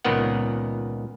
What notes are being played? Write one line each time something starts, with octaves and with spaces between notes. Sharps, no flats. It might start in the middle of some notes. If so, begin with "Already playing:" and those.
C#2 A#2 D#3 B3 F#5